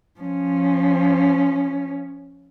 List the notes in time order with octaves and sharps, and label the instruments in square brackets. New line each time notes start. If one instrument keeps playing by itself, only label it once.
[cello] F3 C#4